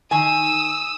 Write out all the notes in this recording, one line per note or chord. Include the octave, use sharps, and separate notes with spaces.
D#3 G#5 D#6 E6